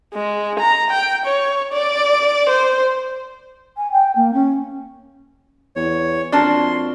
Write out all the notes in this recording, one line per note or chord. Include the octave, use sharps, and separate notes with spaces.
G#3
A#5
G5
C#5
D5
C5
G#5
G5
A#3
C#4
E2 C#5
F2 A#3 D4 F#4 A5 C6